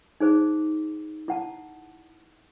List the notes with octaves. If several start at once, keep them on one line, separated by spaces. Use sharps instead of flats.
D#4 G#4 C5 D6
E4 F#5 A5